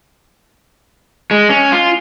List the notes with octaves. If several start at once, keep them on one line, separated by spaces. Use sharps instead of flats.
G#3
C#4
F4